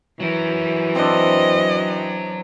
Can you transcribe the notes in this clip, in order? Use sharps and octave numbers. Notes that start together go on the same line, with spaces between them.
E3 F#3 A#4
C4 D4 D#5